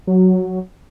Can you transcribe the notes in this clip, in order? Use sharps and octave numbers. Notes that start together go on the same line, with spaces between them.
F#3